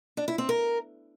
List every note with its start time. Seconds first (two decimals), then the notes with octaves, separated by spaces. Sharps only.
0.17 D4
0.28 E4
0.38 C4
0.49 A#4